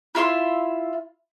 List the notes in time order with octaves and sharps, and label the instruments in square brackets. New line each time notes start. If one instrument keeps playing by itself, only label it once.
[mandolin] E4 F4 E5 C6